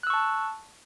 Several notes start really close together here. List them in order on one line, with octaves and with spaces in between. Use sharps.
F#6 E6 C#6 A5